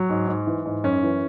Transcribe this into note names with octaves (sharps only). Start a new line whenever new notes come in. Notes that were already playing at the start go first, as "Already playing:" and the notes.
Already playing: F#3
G#2
G#2
E3
G#2
F#2 C#4
E3